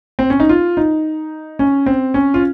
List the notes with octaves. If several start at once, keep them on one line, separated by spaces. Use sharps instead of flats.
C4
C#4
D#4
F4
D#4
C#4
C4
C#4
F4